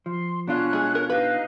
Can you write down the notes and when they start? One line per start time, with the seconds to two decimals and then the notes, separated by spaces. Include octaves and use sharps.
0.06 F3 C6
0.47 B2 C#4 D4 F4 F#6
0.73 G#3 G#4
0.95 A#4
1.10 D#4 G4 B4 F5 F#6